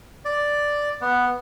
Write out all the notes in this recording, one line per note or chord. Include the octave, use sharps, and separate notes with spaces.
D5
B3